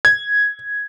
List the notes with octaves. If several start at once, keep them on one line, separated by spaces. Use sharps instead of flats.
G#6